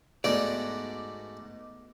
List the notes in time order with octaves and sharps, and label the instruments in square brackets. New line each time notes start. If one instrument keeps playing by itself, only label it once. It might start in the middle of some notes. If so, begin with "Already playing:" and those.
[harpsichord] G#2 A3 F#4 [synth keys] B3 D6 A#6 [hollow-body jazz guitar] D5